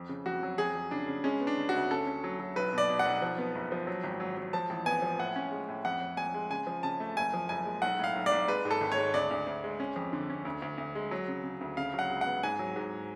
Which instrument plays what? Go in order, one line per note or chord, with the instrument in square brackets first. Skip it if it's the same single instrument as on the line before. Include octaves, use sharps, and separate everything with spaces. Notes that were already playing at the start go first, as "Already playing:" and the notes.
Already playing: [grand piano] F2
C#3
F2 F#4
F#3
F2 G#4
F2
C#3 D4
C#3
G#3 C#4
B3
D4
C#3
F#4
D2
C#4 A4
C#4
F#3
F#3
B1 B4
B2 D5
B2
F#5
B1
F3
B3
F#1
F3
F#3
G#1
F#3
F#3
F3 A5
A1
B3 G#5
F3
A2 F#5
C#4
G#3
A2
F2 F#5
F2
F2 G#5
G#3
C#3 G#5
F3
C#3 A5
A3
F#1 G#5
F3
F#1 G#5
G#3
B1 F#5
A2 F5
B1
D5
B1
G#3 B4
G#2
A4
G#1
C#5
G#3
D2 D5
D2
D2
G#3
C#4
F2
D3
C#4
D2
D2
D2
G#3
F#3
C#3
C#3
D2
C#3 F5
F#3
F#5
C#2
F#5
B3
G#2 G#5
F#3
G#2